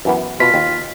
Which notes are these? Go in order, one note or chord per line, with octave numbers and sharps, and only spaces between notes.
F#2 E3 B3
B2 F4 B6
D#2